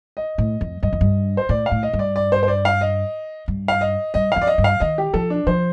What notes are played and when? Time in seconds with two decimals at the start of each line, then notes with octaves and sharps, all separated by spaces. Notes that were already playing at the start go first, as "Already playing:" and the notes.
0.17 D#5
0.38 A2
0.61 F2
0.83 G2 D#5
0.93 F2
1.01 G2
1.37 C5
1.49 A2 D5
1.66 F5
1.71 A2
1.83 D#5
1.93 G2
1.99 D5
2.16 D5
2.32 C5
2.43 C5
2.48 D5
2.65 F5
2.81 D#5
3.48 G2
3.68 F5
3.81 D#5
4.14 G2 D#5
4.32 F2 F5
4.42 D5
4.47 D#5
4.58 G2
4.64 F5
4.80 D#3 D#5
4.98 G4
5.14 F3 A4
5.30 D4
5.47 F3 C5